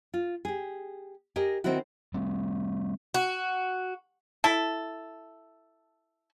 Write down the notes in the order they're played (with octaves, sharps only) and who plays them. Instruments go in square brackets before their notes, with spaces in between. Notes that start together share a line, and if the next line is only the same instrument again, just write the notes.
[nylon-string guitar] F4
G4 G#4
G4 G#4 A#4 D#5
D#3 C4 D#4 E4 F#4
[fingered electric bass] G3 A3 C4
[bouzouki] F#4
[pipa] E4 A4